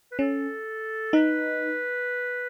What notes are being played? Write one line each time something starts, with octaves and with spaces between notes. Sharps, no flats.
B4
C#4 A4
D#4 B4